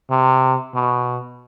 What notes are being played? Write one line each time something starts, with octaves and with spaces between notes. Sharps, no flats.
C3
B2